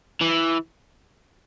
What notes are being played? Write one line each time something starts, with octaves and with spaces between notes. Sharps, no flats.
E3